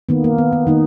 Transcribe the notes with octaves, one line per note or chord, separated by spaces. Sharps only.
D#3 A#3 B3
A#3
B3
B3
D#3 A#3 D#4